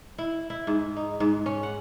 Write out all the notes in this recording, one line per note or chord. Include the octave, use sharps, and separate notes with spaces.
E4
E4
G#2
D#4
G#2
C#4
F#5